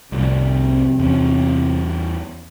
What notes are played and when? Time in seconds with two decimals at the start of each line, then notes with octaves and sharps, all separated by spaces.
0.12 C2 F2 C3
0.99 E2 C#4